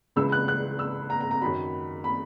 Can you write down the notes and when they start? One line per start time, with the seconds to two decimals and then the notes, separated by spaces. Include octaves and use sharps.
0.16 C#2 C#3 E3 G#3 E6
0.32 F#6
0.48 F#6
0.79 E6
1.10 A#5
1.21 A#5
1.31 A#5
1.42 F#2 D#3 F#3 B5
2.04 B5